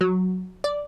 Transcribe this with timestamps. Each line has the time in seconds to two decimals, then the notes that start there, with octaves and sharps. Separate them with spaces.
0.01 F#3
0.64 D5